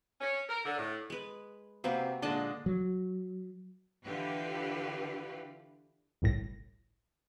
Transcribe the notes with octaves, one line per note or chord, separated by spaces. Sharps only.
C#4
A#4
D3
A2
G#3 B4
C3 A#3 C4 F#4 B4 C5
A#2 D3 G#3 D4 D#5 A5
F#3
D3 E3 F4 G4 B4
G1 C2 A2 A#6